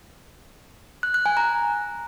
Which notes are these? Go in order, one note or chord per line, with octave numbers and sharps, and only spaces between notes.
F#6
F#6
G#5
A#5